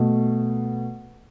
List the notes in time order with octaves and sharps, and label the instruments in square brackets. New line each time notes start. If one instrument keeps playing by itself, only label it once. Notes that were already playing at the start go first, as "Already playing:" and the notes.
Already playing: [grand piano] B2 A3